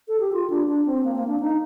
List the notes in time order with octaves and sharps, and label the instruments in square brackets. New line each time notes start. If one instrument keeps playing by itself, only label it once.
[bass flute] A4
G4
F4
D4
D4
C4
A#3
A#3
D4
D#4